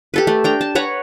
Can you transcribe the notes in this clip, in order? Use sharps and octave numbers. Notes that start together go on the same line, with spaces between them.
G4 A4 B4
A3
D4 G5 A#5
A5
B4 C#5 F#5 A#5